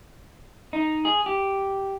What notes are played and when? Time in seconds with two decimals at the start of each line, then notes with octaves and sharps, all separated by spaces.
0.73 D#4
1.05 G#4
1.26 G4